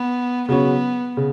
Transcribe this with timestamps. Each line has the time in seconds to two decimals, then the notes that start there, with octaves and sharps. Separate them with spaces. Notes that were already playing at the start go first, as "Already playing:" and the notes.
Already playing: B3
0.48 C#3 F#3 B3 C#4
1.17 C#3